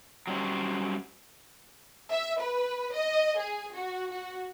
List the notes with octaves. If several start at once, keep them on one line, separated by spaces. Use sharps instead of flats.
F#3 G3 C#4 C5
E5
B4
D#5
G#4
F#4
F#4